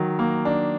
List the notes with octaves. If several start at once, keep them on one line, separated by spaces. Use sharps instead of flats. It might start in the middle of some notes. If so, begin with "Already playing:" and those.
Already playing: D#3 F#3
A#3
D4